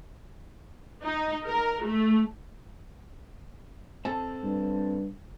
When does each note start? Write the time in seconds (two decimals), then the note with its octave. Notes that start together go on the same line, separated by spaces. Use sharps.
1.03 D#4
1.46 A#4
1.85 A3
4.05 C4 A4 A5
4.43 G2